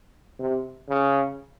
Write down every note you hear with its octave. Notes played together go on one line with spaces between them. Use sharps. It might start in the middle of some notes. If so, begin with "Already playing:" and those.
C3
C#3